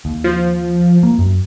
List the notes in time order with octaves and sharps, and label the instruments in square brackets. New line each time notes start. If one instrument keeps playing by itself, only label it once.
[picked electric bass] D#2
[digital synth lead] F3
[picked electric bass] A#3
F#2